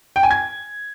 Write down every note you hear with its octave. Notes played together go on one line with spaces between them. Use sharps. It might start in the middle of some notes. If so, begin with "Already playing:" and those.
G5
G#5
G#6